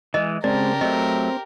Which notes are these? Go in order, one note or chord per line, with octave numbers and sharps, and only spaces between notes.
E3 G#3 D#5
C#3 G#3 C4 G4 A#4 D5 A5
F#3 A3 C4 D#5